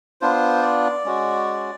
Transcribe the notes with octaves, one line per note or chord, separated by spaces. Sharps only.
B3 D4 F4 C5
D5
G#3 C#4 F#4